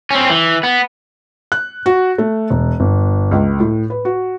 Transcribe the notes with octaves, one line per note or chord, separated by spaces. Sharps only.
C4 C#4
E3
B3
F#6
F#4
A3
E1
G1
C#2
A2
B4
F#4